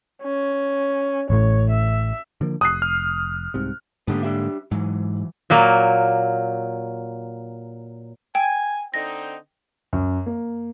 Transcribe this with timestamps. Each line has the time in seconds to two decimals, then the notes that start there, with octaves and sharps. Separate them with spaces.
0.22 C#4
1.30 A1 A2 C#5
1.70 E5
2.41 D3 F3 A#3
2.61 F1 D#6 F#6 C7
2.82 F6
3.54 C2 G#2 C3
4.07 G#2 D3 A#3 B3 D4 G4
4.23 D4 G4 E5
4.71 G#2 E3 F#3
5.50 A#2 F#3 A#3
8.35 G5 G#5
8.94 D3 C4 D#4 A#6
9.93 F#2
10.26 A#3